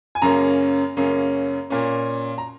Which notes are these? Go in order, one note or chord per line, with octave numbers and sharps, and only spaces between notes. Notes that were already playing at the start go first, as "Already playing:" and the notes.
G#5
F#2 C#3 A#3 C#4 A#5
F#2 C#3 A#3 C#4
A#2 A#3 C#4
A#5